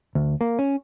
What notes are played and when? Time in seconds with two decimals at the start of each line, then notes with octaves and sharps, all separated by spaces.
0.15 D2
0.41 A#3
0.59 C#4